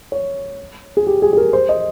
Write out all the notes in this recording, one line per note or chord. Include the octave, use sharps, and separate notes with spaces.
C#5
G#4
G4
G#4
G#4
A#4
C5
D#5